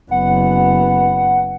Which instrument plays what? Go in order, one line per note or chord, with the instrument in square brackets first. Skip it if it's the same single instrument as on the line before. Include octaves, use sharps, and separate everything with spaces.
[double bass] F#1 B3 [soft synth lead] F#5